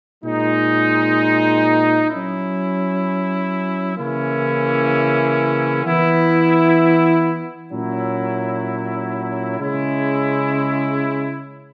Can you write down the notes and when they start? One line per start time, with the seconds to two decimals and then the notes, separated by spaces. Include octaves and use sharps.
0.24 A#2 G#3 D#4
2.10 F#3 C#4 E4
3.98 C#3 E3 A#3 C#4 E4
5.84 E3 B3 E4
7.72 A#2 F#3 C#4 E4
9.58 C#3 G#3 C#4 E4